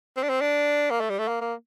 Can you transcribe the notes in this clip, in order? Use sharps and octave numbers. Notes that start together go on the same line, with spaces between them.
C4
D4
C4
D4
A#3
A3
G3
A3
A#3
A#3